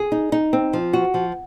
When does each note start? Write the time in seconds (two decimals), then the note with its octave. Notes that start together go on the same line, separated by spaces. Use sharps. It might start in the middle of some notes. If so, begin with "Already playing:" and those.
Already playing: G#4
0.12 D#4
0.32 D#4
0.53 C4
0.73 F3
0.93 F#4
1.14 F3